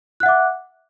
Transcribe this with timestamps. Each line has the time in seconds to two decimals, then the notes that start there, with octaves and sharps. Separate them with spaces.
0.20 F#6
0.23 F#5
0.26 E5
0.29 D6